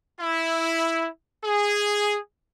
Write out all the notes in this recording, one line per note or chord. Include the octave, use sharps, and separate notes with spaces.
E4
G#4